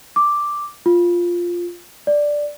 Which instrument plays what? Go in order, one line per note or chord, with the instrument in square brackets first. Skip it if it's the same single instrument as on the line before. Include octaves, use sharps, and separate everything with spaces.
[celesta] D6
F4
D5